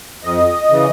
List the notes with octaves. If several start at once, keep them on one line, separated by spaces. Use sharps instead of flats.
F2 D#5
C#3 E3